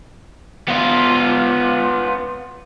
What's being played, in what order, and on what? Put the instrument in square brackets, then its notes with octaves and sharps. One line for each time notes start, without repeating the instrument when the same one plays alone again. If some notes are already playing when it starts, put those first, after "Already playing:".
[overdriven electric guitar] B3 F4